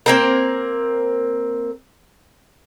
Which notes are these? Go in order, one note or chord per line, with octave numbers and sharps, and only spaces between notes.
A#3 C4 A#4